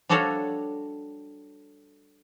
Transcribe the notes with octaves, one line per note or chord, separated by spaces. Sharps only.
G3 D4 F#4 A4 C#5 F5